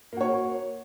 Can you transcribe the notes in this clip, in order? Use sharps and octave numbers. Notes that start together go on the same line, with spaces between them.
A#3 F#4 C#5